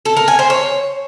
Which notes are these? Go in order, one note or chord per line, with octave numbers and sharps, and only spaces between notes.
A4
A#4
G#5
C5
C#5